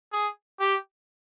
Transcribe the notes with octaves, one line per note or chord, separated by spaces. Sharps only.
G#4
G4